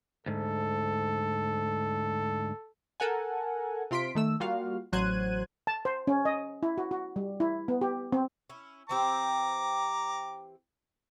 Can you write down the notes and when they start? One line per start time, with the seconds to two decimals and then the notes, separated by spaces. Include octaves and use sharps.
0.26 D2 G#2 A4
3.00 A4 A#4 F#5 G#5
3.91 C3 F4 C6 B6 D7
4.15 D#3 A3 E6
4.40 G3 A#3 F4 F#4 F5
4.92 A1 F#3 C5 F#6 G#6 D#7
5.67 A5
5.85 C5
6.07 C#4
6.25 D#5
6.63 E4
6.78 F#4
6.91 F#4
7.16 G3
7.40 E4
7.68 B3
7.81 G4
8.12 C4
8.50 C#4 E4
8.89 E3 C4 G4 A#5 D6